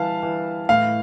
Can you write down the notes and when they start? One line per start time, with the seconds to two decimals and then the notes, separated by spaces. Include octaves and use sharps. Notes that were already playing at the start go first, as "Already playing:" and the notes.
Already playing: E3 G3 F5 A5
0.23 E3
0.69 A2 F5